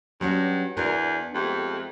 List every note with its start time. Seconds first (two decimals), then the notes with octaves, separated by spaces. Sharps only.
0.21 G2 F#3 C#4 F#4
0.77 E2 B3 D4 F#4 A#4
1.34 F2 G#3 A3 G4